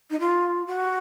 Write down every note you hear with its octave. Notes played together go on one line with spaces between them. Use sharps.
D#4
F4
F#4